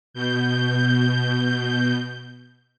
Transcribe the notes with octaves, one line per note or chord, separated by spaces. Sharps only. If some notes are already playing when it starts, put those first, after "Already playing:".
B2 G6